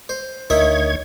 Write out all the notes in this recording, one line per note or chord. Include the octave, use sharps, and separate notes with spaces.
C5
D2 D#3 D#4 C#5 E5 G#6